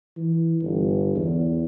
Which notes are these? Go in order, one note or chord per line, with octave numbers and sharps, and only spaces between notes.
E3
G1
E2